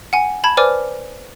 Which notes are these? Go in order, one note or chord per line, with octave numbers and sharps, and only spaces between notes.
F#5 G#5
A5 B5 G#6
B4 C5 D5 G#5 D6 F6